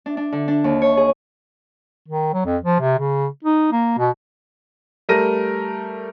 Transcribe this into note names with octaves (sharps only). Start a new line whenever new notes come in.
D4
D4
D3
D4
D#2
C#5
G#4
D#3
F#3
F2
F3
C3
C#3
D#4
A#3
B2
G3 A3 A#4 A#6 D#7